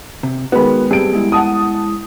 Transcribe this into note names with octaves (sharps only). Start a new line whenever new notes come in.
C3
D#3 G#3 B3 F#4 B5
G3 A3 C4 G#4 D7
G#3 B3 E4
F#5 A5 D#6